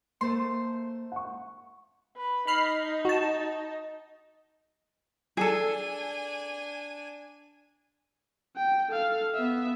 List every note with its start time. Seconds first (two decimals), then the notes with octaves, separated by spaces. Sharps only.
0.21 A3 A#3 C5 C6
1.12 F#5 C#6
2.17 B4
2.47 D#4 B5 F6 C7
3.05 F#4 A5
5.37 D4 G#4 A4 G#5
8.56 G5
8.89 A4 F5
9.35 B3 E5